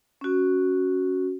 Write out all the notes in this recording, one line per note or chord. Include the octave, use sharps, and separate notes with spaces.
C#4 F#4